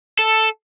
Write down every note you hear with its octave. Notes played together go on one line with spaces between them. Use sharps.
A4